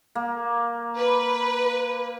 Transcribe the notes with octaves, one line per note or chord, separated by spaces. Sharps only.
A#3
B4